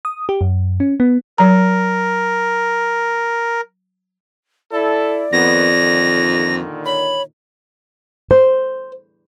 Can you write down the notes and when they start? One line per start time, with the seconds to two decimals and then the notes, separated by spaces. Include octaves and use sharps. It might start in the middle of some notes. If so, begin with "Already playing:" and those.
0.05 D#6
0.29 G4
0.41 F#2
0.80 C#4
1.00 B3
1.38 F#3 A#4 A#5
4.72 E4 A4 D5
5.33 F2 D#3 B3 A#6
5.79 A#2 D3 D#3
6.86 C#5 B5
8.31 C5